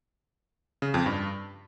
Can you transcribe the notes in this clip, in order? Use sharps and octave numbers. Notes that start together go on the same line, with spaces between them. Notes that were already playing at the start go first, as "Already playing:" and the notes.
C#3
F2
G2